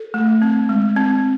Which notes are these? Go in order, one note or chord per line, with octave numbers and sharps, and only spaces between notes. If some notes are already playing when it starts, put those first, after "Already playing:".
Already playing: A4
A3
C4
G#3
C4